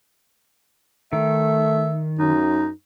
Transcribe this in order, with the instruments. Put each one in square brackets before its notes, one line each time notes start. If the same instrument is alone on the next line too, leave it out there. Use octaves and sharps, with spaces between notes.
[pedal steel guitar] D#3 [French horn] A3 [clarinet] E5
[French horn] F#2 [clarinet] D#4